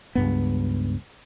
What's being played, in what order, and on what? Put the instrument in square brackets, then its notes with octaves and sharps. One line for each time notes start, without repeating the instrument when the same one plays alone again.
[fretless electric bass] C#2 G2 B3